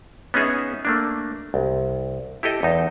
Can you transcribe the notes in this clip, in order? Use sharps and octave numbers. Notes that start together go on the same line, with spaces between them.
B3 C#4 D#4 G#4 E5
A3 A#3 D4
C2
E4 G4 A4 D#5
E2 D#4